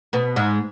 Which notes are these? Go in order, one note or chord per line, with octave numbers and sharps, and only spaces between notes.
B2 B3
G#2 G#3